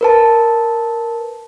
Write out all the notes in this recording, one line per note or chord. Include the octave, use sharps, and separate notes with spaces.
A#4 B4 A5